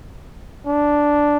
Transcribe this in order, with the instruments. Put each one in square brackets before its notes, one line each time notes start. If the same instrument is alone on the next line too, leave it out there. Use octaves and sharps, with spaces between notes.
[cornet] D4